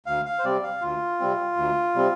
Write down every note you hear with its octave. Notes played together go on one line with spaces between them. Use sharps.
D2 F5
F5
C5
C3 G3 C4 D5
F5
D2 F4
C3 G3 C4
D2
C3 G3 C4